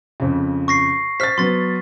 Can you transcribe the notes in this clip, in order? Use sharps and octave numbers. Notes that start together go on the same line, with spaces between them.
F2 C#3
C#6 A#6 C7
C5 F6 A6 B6
F#3 B3 C6 A6